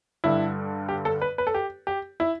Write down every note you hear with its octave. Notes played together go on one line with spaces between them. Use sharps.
G2 D3 G3 E4
G4
A4
B4
B4
A4
G4
G4
E4